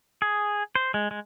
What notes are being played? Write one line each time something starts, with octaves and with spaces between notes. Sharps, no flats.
G#4
C5
G#3
G#3